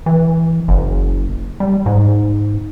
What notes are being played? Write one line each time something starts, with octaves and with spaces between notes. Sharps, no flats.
E3
F#1
G3
G#2